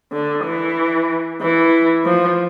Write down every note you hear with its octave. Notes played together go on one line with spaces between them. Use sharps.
D3
E3
E3
F3